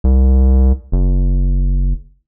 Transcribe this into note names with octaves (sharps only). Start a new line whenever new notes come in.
C2
F#1